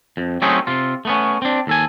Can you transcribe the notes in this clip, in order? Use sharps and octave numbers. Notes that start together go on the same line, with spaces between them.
F2
F#3 A3 C4 C#4 D#4 G#4
C3 F4
A3 B3 C#4
C4 D4
D#2 A4 G#5